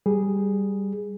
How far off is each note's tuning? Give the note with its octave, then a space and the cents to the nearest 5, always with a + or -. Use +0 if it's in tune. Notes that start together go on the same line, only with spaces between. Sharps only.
G3 +0 G#4 +0